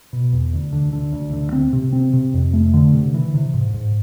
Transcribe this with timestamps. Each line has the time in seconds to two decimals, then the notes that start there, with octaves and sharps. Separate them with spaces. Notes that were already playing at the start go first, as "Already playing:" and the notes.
0.13 B2
0.33 E2
0.53 D2
0.72 D3
0.93 D3
1.12 D2
1.33 D3
1.53 C4
1.73 C3
1.93 C4
2.13 C3
2.34 F2
2.53 A3
2.74 D3
2.93 C3
3.14 E3
3.34 C3
3.54 G#2
3.74 G#2